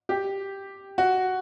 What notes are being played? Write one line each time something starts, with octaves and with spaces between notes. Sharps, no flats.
G4
F#4